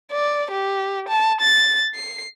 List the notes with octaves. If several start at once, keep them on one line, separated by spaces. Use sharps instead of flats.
D5
G4
A5
A6
C7